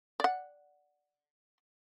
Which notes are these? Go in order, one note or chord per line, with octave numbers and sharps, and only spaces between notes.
D5 F#5